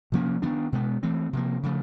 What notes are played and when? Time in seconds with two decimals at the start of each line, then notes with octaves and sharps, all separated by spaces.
0.12 C3 F3 A#3 C#4
0.42 D#3 F#3 B3 D4
0.72 B2 G#3 B3
1.03 E3 A3 C4
1.33 C3 F3 A#3
1.63 C#3 F3 A3